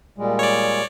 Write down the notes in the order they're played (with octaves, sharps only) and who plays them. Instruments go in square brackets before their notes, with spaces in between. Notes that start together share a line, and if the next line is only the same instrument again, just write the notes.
[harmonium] A#2 G3 G#3
[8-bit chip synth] C#5 D5